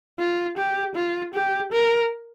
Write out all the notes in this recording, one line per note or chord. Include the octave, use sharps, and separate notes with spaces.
F4
G4
F4
G4
A#4